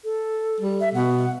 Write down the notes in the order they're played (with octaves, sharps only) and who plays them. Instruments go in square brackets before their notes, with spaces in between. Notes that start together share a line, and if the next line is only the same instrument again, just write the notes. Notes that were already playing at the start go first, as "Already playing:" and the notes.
[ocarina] A4
[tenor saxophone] G3
[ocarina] E5
[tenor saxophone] B2 [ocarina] F#5